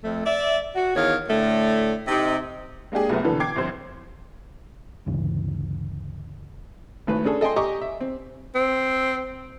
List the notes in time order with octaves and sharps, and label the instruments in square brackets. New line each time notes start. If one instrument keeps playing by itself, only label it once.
[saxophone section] F2 A3
D5 E5
F#4
E2 D#3 C#5 F5
A2 D3 A3
C3 D#4
[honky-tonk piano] G#3 A#3 D4 G4 G#4
C2 F#2 F3 A3 B3
B2 D3 E3 A4 B4
G5 D6 G#6 C7
G1 F2 C5
[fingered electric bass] D2 G2 C#3 E3
[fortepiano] G#1 A2 B4
C#4 D4 G#4 A4
A4 D#5 G5 G#5 C6
G4 D#5 G#5 A#5 C#6 D6
E5
C4
[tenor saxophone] C4